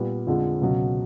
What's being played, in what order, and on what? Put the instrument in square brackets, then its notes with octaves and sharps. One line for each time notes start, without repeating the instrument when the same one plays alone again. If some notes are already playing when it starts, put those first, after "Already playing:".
Already playing: [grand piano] A#2 G3 B3
F2 D3 F3 G#3
C#2 B2 F#3